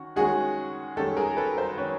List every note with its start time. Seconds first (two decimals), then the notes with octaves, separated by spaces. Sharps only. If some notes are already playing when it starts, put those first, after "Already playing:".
Already playing: D#3 C#4 F#4
0.16 D#3 G#3 C#4 F#4 G#4
0.97 D#3 G#3 C#4 G4 A4
1.17 G#4 A#4
1.37 A4 B4
1.58 A#4 C5
1.78 D#3 G#3 C#4 B4 C#5